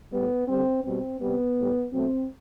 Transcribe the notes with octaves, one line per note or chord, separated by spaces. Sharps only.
A2 G3 B3
D3 G3 C4
B2 G3 C4
C3 G3 B3
A2 G3
B2 F#3 A3 C4